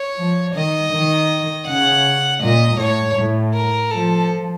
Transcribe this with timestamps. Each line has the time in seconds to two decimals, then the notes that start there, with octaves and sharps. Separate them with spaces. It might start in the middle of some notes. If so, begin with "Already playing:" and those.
Already playing: C#5
0.17 F3
0.54 D#3 D#5
0.92 D#3
1.67 C#3 F#5
2.42 A#2 D#5
2.79 A2 C#5
3.17 A2
3.54 A#4
3.91 F3 A4